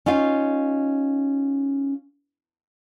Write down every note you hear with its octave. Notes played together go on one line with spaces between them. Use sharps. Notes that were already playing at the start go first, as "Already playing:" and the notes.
C#4 D#4 F4 F5